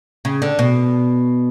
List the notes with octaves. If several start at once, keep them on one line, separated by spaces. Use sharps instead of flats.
C#3
D3
B2